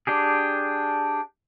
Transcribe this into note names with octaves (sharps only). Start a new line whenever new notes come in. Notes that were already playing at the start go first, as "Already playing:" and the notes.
D4 G4 G#4